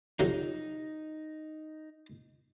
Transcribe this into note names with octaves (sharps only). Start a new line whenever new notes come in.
F2 C3 F#3 D#4